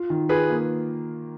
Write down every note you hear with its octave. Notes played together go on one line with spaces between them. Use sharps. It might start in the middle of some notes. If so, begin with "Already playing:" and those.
Already playing: F4
D#3
F4 G#4 B4
A#3